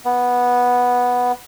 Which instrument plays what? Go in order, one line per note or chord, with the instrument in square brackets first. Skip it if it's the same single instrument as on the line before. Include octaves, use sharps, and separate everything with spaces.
[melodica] B3